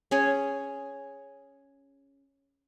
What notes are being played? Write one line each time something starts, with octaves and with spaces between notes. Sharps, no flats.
C#4 G#4 C#5